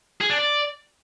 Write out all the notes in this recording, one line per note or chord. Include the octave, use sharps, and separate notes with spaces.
G#4
D4
D5